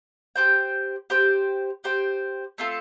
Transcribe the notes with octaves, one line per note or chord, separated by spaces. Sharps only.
G4 C5 G5
G4 C5 G5
G4 C5 G5
A3 C4 F4 A4